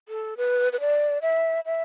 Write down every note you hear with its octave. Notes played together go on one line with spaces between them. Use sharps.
A4
B4
B4
D5
E5
E5